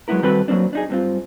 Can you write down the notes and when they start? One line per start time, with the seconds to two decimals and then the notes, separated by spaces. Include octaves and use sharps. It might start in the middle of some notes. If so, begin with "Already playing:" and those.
0.08 F#3 G#3 A3 B3 E4 A#4
0.23 D#3 G3 C4 F#4 A4 B4
0.48 F#3 G#3 A#3 C4 D4
0.73 D4 D#4 G#4
0.90 G2 C4 F4